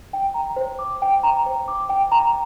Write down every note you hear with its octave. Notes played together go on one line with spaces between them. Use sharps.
G5
A#5
C5
D6
G5
A#5
C5
D6
G5
A#5